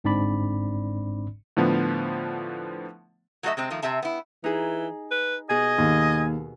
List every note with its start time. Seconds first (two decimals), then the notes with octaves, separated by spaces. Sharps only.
0.04 G1 G#2 C4 D4 D5 B5
1.57 A2 D3 F3 B3
3.43 F#3 A3 F#4 G#4 D#5 E5
3.57 C3 G#3 C4
3.70 D#3 F3 A3
3.82 C3 C4 E5 A5
4.02 B3 E4
4.44 E3 D#4 G#4
5.11 B4
5.49 B2 G#4 D#5 G#5
5.78 D#2